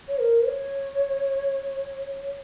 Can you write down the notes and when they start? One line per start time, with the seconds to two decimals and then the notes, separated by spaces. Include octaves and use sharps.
0.09 C#5
0.19 A#4
0.46 C#5